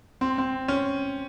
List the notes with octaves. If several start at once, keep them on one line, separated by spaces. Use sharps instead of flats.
C4
C4
C#4